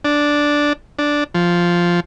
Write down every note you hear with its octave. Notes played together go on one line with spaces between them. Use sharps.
D4
D4
F3